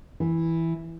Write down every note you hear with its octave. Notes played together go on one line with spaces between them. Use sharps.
E3